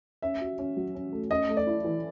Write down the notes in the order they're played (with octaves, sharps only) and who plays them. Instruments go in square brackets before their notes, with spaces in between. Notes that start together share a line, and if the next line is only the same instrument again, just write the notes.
[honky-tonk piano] C#4 [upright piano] E5
[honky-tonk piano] F#4
C#4
F#3
C#4
A3
[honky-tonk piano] C#4 [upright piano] D#5
[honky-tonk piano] A3
[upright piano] D5
[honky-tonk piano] E4
E3